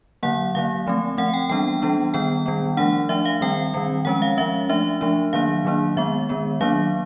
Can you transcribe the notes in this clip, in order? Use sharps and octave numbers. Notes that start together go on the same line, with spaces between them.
D3 F#3 A#3 F#5
D3 F#3 A#3 F5
F3 A3 C4
F3 A3 C4 F#5
G5
E3 G3 B3 D4 G5
E3 G3 B3 D4
D#3 G3 B3 G5
D#3 G3 B3
F3 A3 D4 F#5
F3 A3 D4 E5
F5
D#3 G3 C4 G5
D#3 G3 C4
F3 G#3 C#4 F#5
F5
F3 G#3 C#4 E5
F3 A3 D4 E5
F3 A3 D4
D#3 F#3 A#3 D4 F5
D#3 F#3 A#3 D4
D#3 G#3 B3 E5
D#3 G#3 B3
D#3 F#3 A#3 D4 F5